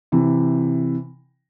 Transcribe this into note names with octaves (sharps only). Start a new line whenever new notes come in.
C3 E3